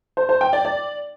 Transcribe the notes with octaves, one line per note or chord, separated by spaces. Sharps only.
C5
C5
G5
D5
D5